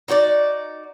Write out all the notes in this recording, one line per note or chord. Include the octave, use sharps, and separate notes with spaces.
D#4 F#4 C#5 D5